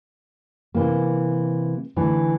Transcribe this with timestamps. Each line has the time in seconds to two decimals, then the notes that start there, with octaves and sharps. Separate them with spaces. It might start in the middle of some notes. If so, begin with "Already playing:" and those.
0.74 C3 E3 A#3
1.96 D3 E3 A3